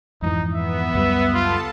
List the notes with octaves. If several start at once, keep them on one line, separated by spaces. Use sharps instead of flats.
F2 G#2 E3 D#4
B3 E5
C#2 F#2 G3
F4 A4 A5